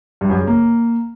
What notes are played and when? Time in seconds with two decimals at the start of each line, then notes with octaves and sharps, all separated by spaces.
0.21 G2
0.30 F#2
0.39 C#3
0.47 A#3